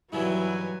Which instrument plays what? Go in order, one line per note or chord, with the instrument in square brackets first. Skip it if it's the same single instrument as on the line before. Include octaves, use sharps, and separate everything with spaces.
[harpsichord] G2 D#3 E3 [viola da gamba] F#3 [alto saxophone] E4 [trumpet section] B4 G#5